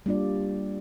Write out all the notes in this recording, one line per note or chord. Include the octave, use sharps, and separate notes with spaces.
G3 A#3 D4 F4 D5